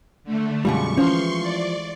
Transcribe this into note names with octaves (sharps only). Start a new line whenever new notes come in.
D3 A3
F#2 B2 G3 G#3 F4 G4 C#6
E3 F3 C#4 C5 F5 C6 C#6
D5